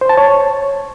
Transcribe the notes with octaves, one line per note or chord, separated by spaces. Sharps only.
C5
A5
C#5